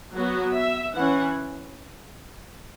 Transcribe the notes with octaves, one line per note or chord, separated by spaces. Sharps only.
F#3 B3 F#4
E5
E3 C#4 F#5